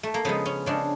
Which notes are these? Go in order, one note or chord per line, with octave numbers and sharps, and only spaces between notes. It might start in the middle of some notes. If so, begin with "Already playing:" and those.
A3
A#3
C#3 F3 G#3 B3
C#4
C#3 F3 G#3 D4